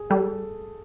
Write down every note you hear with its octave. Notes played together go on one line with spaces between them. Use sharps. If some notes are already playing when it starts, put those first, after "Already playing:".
Already playing: G#4
G3 A4